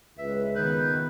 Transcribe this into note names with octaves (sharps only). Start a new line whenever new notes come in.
C#2 B4 E5
D#3 B3 B4 G6